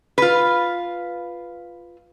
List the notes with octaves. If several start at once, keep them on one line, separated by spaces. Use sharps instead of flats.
F4 B4